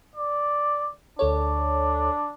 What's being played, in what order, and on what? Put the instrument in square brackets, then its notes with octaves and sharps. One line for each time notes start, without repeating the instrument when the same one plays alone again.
[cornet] D5
[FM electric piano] D2 A4 C#5 [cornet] D4